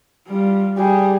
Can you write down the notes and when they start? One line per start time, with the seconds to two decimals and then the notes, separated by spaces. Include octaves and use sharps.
0.28 G3 F4
0.78 G3 G#4